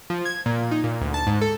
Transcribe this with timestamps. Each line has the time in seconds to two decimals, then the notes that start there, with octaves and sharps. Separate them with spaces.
0.10 F3
0.25 G#6
0.46 A#2
0.71 D#4
0.84 A#2
1.01 D2
1.14 A5
1.27 G#2
1.41 A4